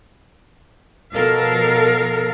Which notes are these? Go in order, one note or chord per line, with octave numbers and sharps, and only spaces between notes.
B2 F3 A4 A#4 F5